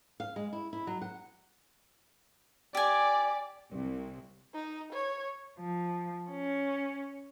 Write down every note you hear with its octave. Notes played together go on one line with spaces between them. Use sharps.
F5
G#3
E4
E4
F#3
F#5
G4 D5 G#5
C2
D#4
C#5
F3
C#4